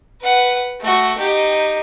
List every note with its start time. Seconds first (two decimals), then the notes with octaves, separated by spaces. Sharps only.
0.21 B4 F#5
0.80 A3 F#4
1.17 D#4 G4